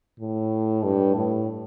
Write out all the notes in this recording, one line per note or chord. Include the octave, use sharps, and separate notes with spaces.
A2
G2
A2